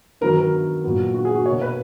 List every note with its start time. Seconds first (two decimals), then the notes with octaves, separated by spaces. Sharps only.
0.21 D#3 F#3 B3 A#4
0.37 A#4
0.84 A#2 F#3 B3
1.15 F#4
1.25 G#4
1.35 F#4
1.45 A#3 C#5
1.50 B2
1.61 B4